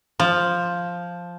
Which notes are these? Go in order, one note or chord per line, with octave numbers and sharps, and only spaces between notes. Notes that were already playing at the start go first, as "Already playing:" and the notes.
F3